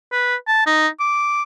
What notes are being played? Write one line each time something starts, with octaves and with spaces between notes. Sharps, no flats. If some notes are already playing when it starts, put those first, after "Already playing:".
B4
A5
D#4
D6